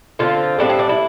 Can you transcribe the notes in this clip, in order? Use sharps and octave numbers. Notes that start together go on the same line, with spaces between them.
D3 F3 A3 C4 F4
A2 G3 C4 D4
C4
D4
E4